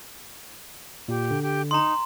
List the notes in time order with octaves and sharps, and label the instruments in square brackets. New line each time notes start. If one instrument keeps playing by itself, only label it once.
[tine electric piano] A#2 [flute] G4
[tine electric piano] D3
[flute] G4
[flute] D#4 [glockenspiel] A#5 C6